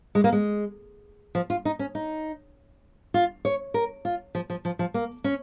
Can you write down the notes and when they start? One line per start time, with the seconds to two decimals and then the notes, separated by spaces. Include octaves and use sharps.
0.15 G#3
0.24 A#3
0.33 G#3
1.35 F3
1.50 F4
1.65 D#4
1.79 C#4
1.95 D#4
3.14 F4
3.45 C#5
3.74 A#4
4.05 F4
4.35 F3
4.50 F3
4.65 F3
4.79 F3
4.94 A#3
5.24 C#4